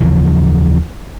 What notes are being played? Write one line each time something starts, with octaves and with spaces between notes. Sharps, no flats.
D#2 C#3 E3 F3